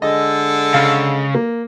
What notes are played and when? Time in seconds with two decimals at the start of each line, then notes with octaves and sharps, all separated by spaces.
0.02 D3 G#3 A4 D#5
0.74 C#3 F5
1.35 A#3